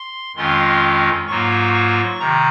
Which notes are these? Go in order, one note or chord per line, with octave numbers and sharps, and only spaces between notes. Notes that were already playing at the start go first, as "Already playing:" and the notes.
Already playing: C6
F2 D#3 G#3 C#4 F4 C6
G#2 F#3 A#3 F4 C#6
C#6
C3 D#3 A#5